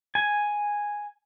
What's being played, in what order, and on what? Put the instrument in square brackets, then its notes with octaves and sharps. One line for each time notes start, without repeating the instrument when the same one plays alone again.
[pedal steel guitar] G#5